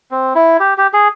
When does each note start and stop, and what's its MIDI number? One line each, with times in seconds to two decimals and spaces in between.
0.11 0.33 60
0.35 0.57 64
0.60 0.74 67
0.78 0.87 67
0.93 1.08 68